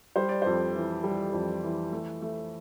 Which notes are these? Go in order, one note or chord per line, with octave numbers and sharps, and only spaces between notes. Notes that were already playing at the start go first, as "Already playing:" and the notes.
G3 C5
D5
F2 C5
E3
G3
F2
E3
A3
A3